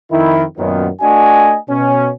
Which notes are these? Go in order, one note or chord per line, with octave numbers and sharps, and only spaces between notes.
F2 D#3 E4
F#2 A#2 D#3 B3
A3 D4 F#4 D#5 G#5
B2 C#4